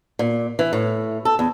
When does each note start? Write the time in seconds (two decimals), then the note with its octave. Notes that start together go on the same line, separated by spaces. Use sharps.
0.19 A#2
0.59 E3
0.73 A2
1.25 A4
1.39 E2